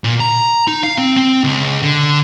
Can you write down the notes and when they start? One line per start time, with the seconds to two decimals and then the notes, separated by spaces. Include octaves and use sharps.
0.04 A#2
0.20 A#5
0.68 D#4
0.83 F5
0.98 C4
1.17 C4
1.44 C#2
1.83 D3